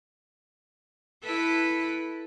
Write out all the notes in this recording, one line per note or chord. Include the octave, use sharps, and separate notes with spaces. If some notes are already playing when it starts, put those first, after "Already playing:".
E4 A4 B4